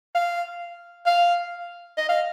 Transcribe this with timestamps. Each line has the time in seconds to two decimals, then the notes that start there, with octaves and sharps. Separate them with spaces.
0.15 F5
1.06 F5
1.97 D#5
2.09 F5